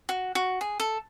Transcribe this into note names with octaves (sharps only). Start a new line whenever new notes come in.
F#4
F#4
G#4
A4